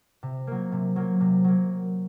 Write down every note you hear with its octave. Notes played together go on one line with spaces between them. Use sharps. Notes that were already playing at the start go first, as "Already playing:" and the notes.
C3
F#3 A#3
C3
F#3 A#3
C3
F#3 A#3